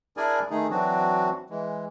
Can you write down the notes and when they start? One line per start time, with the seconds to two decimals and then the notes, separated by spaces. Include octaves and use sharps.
0.17 D4 E4 G#4 A#4 D5 G#5
0.50 D#3 A3 D#4 G#4
0.70 E3 F#3 C4 D4 F#4
1.50 E3 G#3